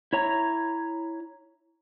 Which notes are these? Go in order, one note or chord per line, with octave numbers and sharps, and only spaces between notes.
E4 C#5 A#5